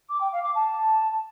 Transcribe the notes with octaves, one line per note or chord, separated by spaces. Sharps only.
D6
G5
F5
D6
A5